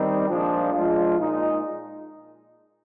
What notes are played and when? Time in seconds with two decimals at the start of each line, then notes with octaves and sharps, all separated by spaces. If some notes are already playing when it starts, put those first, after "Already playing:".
Already playing: D#3 G3 C4 D#4
0.27 A#2 F3 G#3 D4 F4
0.72 F3 G#3 D4 F4
1.18 A#2 G#3 D#4